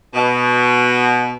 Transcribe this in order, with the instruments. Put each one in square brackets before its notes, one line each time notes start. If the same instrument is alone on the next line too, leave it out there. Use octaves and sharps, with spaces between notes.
[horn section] B2